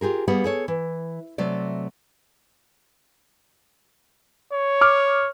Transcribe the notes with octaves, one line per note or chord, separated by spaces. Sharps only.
F4 G4 G#4 A#4
G3 A#3 B3 G#4 F#5
G#4 A4 C#5
E3
C3 F#3 A3 D5
C#5
D6 F6